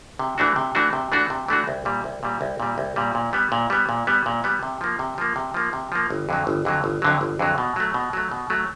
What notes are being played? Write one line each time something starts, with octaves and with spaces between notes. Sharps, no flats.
C3
E3 A3 D4 F#4
C3
E3 A3 D4 F#4
C3
E3 A3 D4 F#4
C3
E3 A3 D4 F#4
C2
A#2 G3
C2
A#2 G3
C2
A#2 G3
C2
A#2 G3
A#2
G3 B3
A#2
G3 B3
A#2
G3 B3
A#2
G3 B3
C3
F3 A#3
C3
F3 A#3
C3
F3 A#3
C3
F3 A#3
G1
F2 D3 F#3
G1
F2 D3 F#3
G1
F2 D3 F#3
G1
F2 D3 F#3
B2
F#3 A3
B2
F#3 A3
B2
F#3 A3